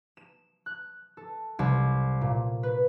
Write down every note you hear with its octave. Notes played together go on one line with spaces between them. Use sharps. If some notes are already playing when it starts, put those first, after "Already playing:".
E7
F#6
A4
C2
A#2
B4